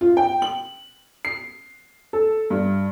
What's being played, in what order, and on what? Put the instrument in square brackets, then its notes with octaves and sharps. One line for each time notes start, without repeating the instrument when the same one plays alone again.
[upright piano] F4
G5
F#7
C7
A4
G2